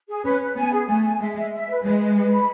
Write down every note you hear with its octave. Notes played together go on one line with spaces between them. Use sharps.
G#4
C#4 B4
B4
B3 G#5
G#4
A3 G#5
G#5
G#3 E5
E5
E5
B4
G#3 B4
B4
B4
B5